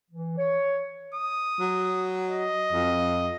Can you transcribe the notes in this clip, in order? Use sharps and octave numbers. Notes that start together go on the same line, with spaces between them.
E3
C#5
D#6
F#3
D#5
F2